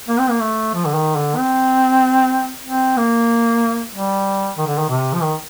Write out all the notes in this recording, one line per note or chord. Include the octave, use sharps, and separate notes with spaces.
A#3
C4
A#3
A3
F3
D3
D#3
D3
C4
C4
A#3
G3
D#3
D3
D#3
C3
F3
D#3